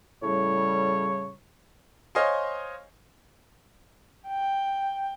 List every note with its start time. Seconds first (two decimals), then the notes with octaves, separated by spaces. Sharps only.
0.23 A2 C#3 G3 C#5
2.15 C5 C#5 D#5 F5 G#5 C6
4.29 G5